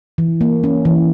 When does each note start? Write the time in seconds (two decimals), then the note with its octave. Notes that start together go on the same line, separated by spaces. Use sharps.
0.18 E3
0.41 A#3
0.64 C#4
0.85 E3